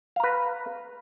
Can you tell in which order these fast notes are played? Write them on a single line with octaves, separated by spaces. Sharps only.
F5 A#5 B4